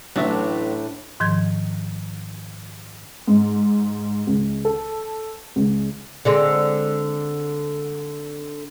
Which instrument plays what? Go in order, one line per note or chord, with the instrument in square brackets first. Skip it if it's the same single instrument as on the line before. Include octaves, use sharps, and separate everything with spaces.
[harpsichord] A1 [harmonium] A2 [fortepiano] F#3 E5 [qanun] D4
[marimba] G#2 D#3 F3 G#6
[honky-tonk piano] G#2
C#2
A4
C#2
[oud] D3 G#3 C4